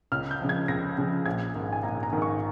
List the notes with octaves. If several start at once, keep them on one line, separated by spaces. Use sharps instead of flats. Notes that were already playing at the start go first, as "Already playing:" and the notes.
C#2 F6
G6
C#3 F3
G#6
C#2 A#6
C#3 F3
A#1 G#6
G#2 D#3
G#5
A#1 A#5
A#5
G#2 D#3
C#6